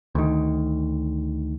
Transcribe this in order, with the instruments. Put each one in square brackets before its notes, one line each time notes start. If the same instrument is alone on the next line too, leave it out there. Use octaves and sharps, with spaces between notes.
[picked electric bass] D2 D#3